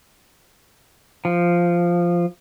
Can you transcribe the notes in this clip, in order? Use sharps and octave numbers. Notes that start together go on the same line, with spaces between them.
F3